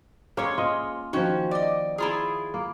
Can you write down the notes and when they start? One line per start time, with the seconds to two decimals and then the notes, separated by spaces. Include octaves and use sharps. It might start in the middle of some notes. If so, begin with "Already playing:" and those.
0.37 G#3 A#3 C#4 C#5
0.58 F4 D#5
1.13 D#3 F3 C#4 F#4
1.51 D5 D#5
1.98 E4 F4 G#4
2.54 A#3